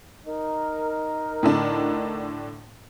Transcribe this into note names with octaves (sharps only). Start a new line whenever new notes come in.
D#4 A#4
A2 D3 D4